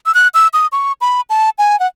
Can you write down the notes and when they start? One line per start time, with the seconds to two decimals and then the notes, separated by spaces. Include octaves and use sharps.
0.06 E6
0.14 F#6
0.34 E6
0.54 D#6
0.72 C#6
1.01 B5
1.30 A5
1.58 G#5
1.80 F#5